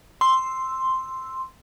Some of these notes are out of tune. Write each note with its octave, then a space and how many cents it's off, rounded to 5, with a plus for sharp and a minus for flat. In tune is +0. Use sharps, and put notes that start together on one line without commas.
C6 +0 E6 +0